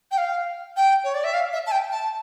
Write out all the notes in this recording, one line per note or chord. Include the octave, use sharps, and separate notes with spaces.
G5
F5
G5
C#5
D5
E5
F5
E5
A5
G5
A5